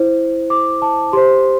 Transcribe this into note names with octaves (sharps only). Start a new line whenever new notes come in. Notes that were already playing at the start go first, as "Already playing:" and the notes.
Already playing: E4 C5
D6
A5
G4 C5 C6